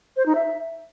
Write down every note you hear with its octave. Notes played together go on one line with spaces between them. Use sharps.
C5
D#4
E5